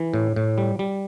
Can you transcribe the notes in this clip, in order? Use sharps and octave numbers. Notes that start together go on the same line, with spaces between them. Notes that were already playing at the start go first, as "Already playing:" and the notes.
Already playing: E3
A2
A2
G3
G3